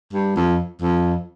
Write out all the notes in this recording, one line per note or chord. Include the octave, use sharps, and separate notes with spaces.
G2
F2
F2